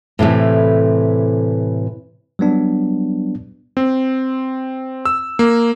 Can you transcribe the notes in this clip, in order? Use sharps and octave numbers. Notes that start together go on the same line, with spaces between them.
A2 C3 E3 A3
F#3 G3 B3 D4
C4
E6
A#3